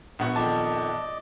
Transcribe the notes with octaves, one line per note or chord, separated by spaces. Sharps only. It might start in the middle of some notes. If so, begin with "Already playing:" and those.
A#1 B3 C#6
F2 D#3 D5 D#5 A5 D6